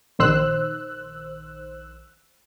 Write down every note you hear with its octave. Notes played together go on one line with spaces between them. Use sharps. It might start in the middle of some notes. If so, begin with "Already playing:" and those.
A#1 D#3 C5 E6 F#6